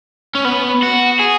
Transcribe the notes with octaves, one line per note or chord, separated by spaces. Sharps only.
C#4
B3
F#4
G#4